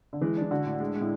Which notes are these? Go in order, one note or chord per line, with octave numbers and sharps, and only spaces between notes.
D3
E3 G#3
E3 D4
D3 F#4
A2
G#3
G#3
A2